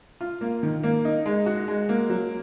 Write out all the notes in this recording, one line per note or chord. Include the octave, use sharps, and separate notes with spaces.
F4
A#3
D#3
A#3
D#4
G#3
F#4
G#3
A#3
F#3